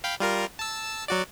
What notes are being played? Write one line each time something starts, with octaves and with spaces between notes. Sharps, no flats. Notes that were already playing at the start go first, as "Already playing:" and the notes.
F5 G5 B5
G3 F4 A#4
A5 E6
F#3 F#4 D5